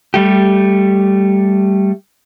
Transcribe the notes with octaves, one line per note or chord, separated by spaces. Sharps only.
G3 A3 G4